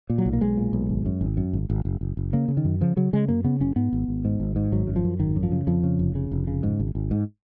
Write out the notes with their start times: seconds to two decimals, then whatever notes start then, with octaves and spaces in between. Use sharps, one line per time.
0.10 A#2
0.18 F#3
0.26 B1
0.33 A#3
0.41 B1 G#3
0.57 A#2
0.73 B1
0.90 G#1
1.06 F#2
1.21 G#1
1.37 F#2
1.53 G#1
1.70 G#1
1.85 F#1
2.01 F#1
2.17 F#1
2.33 C#3 A#3
2.48 C#3
2.57 D#3
2.65 F#2
2.81 C#3 F3
2.96 C#3 F#3
3.13 C#3 G#3
3.28 F#2 A#3
3.44 C#3 B3
3.60 F#1 C#4
3.76 G#2 B3
3.93 G#1
4.08 G#1
4.25 G#2
4.40 G#1
4.56 G#2
4.72 G#1 F#3
4.87 F#2
4.96 F3
5.04 F#2
5.20 G#1 D#3
5.36 F#2
5.43 F3
5.52 C#3
5.67 F2 F3
5.83 C#3
5.99 F1
6.15 C#3
6.31 F1
6.47 C#3
6.63 G#2
6.79 G#1
6.95 G#1
7.11 G#2